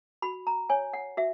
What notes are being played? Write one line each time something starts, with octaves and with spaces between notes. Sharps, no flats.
F#4 B5
A#5
C#5 G#5
F#5
F#4 E5